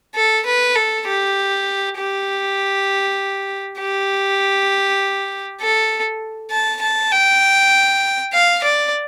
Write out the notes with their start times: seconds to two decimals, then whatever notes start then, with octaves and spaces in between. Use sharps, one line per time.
0.15 A4
0.46 B4
0.76 A4
1.07 G4
1.98 G4
3.80 G4
5.61 A4
6.51 A5
6.82 A5
7.12 G5
8.33 F5
8.64 D5